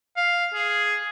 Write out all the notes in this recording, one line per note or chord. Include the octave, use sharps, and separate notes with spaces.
F5
G#4